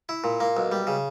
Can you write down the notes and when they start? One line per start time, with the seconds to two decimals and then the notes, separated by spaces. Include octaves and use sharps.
0.09 E4
0.24 A#2
0.40 A#3
0.57 B1
0.72 G3
0.87 C#3